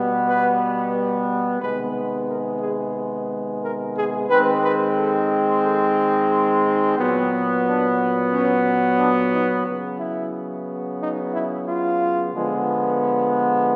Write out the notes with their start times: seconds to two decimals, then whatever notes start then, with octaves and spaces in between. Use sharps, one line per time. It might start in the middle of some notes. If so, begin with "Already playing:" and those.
Already playing: B2 G3 B3
0.28 B4
1.61 C3 D#3 G#3 B3 B4
2.28 A#4
2.61 G#4
3.63 A#4
3.96 G#4
4.29 D#3 G#3 C4 B4
4.63 B4
4.96 A4
5.64 A4
6.31 G#4
6.64 D#4
6.97 A#2 F#3 B3
7.65 D4
8.32 C#4
8.99 D4
9.32 D#4
9.66 C#3 F#3 B3
9.99 E4
11.00 D#4
11.33 E4
11.67 F4
12.34 D3 F3 G#3 B3